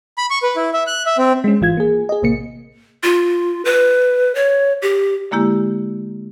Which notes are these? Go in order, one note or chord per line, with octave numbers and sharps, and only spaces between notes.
B5
C#6
B4
E4
E5
F#6
E5
C4
G#3 C#4
G#1 E3 F4 G#6
A#3 G#4
G#4 D#5
A1 C3 A#3 C#7
F4
B4
C#5
G4
D3 G#3 A#3 E4 G4